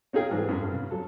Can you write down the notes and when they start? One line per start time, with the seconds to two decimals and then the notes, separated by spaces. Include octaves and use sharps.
0.13 C#4 D#4 F4 G#4 G5
0.31 G#2 E3
0.49 F#2
0.60 G2
0.72 C#3
0.91 F#3 A4